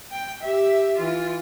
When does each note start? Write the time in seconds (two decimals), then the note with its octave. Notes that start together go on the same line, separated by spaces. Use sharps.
0.11 G5
0.43 G4 E5
0.97 E3 F4